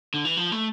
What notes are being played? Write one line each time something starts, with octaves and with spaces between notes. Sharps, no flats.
D3
E3
F3
A3